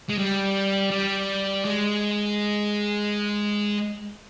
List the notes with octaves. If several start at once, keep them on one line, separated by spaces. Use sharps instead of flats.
G#3
G3
G3
G#3